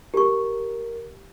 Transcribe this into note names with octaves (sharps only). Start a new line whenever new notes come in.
G4 A#4 C#6